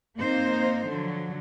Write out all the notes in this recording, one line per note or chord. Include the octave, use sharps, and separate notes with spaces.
A#3 C4 D#4 C5
D3 F3 F#3